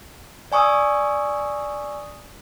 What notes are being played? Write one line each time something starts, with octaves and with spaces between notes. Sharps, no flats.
D5 G#5 C#6 D#6 E6